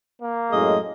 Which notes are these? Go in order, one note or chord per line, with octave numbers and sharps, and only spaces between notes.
A#3
F#2 A2 G#3 D#5